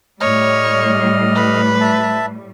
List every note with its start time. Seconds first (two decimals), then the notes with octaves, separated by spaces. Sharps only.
0.21 A2 G3 C#5 D#5 F6
1.35 B4
1.81 E5 A5